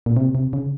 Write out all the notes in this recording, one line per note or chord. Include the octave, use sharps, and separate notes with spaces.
A#2
C3
C3
C#3